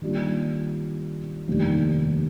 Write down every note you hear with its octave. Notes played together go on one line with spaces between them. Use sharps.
D#3 G3 A#3 D4 F4
F1 D#2 D#3 G3 D4